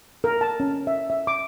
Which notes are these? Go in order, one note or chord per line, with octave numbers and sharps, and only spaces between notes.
A#4
A5
C#4
E5
E5
D6